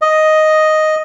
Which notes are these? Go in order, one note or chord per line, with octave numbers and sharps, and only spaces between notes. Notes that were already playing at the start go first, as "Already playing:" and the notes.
D#5